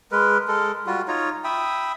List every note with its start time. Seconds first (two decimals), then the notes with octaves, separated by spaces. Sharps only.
0.12 G#3 A#4 B4
0.48 G#3 A4 A#4
0.86 G3 F4 F#4
1.08 D#4 F4 C#5 A#5
1.44 E5 G5 B5 D#6